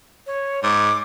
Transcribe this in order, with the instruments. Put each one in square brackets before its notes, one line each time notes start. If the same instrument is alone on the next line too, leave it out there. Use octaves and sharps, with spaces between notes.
[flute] C#5
[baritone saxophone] G#2 [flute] D6